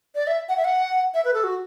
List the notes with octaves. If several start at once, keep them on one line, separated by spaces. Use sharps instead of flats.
D5
E5
F#5
E5
F#5
E5
B4
A4
F#4